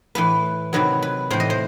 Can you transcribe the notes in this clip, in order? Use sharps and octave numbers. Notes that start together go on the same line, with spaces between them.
A2 E3 B4
C3 D#3 F#3 B4
B4
A2 E3 C5
D#5
C5